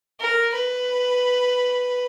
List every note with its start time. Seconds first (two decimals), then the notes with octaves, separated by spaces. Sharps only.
0.20 A#4
0.55 B4